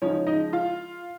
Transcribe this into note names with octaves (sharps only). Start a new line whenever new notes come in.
C#3 F3 G#3 C#4 D#4 C#5
D#4 D#5
F4 F5